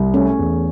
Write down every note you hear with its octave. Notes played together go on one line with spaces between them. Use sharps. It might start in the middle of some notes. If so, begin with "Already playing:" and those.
Already playing: C2
A3 C#4
E2